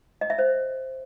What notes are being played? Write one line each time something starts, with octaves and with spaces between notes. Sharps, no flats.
D#5
E5
C5